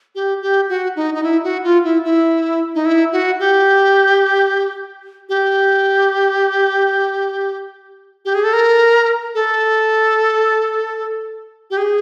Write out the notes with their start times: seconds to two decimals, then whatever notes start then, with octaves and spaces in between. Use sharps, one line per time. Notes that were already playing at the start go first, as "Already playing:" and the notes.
0.15 G4
0.42 G4
0.69 F#4
0.96 D#4
1.14 D#4
1.23 E4
1.43 F#4
1.64 F4
1.84 E4
2.04 E4
2.75 D#4
2.85 E4
3.12 F#4
3.39 G4
5.29 G4
8.25 G4
8.34 G#4
8.44 A4
8.53 A#4
9.35 A4
11.70 G4
11.78 G#4